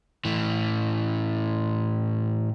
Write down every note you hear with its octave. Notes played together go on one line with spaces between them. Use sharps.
A2 E3